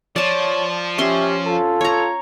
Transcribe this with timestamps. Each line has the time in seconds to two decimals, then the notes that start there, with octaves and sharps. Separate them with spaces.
0.16 F3 C#5 D5 A5
0.98 C#4 G4 E5 C6
1.46 F4 A4
1.81 C#5 A#5